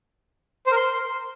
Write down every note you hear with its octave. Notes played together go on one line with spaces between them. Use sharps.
C5
A#4
C6